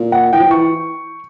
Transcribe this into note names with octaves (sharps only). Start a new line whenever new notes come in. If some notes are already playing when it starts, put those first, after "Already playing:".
Already playing: A#2
F#5
E3 G5
F3
E3 C#6